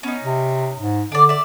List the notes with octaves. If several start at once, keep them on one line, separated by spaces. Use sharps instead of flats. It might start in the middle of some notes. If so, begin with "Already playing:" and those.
B3 C#4 D#4
C3
G#2
D3 D4 D5
D5 E5